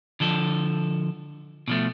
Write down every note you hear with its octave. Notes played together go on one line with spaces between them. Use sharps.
D3 F3 A4
B2 F3 A3